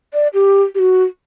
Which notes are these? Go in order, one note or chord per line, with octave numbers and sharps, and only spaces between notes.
D5
G4
G4
F#4